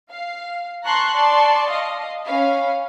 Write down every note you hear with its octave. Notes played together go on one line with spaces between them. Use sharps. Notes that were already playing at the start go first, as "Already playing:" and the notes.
F5
A5 A#5 C6 C#6 F#6
D5 A5 C6 C#6
D#5 F5
C#4 F5 B5